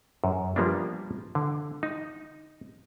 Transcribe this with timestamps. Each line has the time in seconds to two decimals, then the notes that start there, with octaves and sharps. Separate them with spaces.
0.24 F#2
0.56 F3 G3 A#3 B3 D4
1.35 D3
1.83 D#4